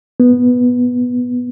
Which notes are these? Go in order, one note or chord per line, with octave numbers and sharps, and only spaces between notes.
B3